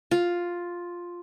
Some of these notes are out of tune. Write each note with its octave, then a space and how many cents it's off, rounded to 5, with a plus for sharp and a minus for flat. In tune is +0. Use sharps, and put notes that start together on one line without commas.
F4 +5